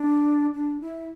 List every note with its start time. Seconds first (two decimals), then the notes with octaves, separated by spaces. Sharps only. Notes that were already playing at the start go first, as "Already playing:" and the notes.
Already playing: D4
0.54 D4
0.81 E4